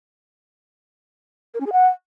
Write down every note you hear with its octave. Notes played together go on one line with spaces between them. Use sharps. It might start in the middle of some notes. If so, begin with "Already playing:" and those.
A#4
C#4
G#4
F#5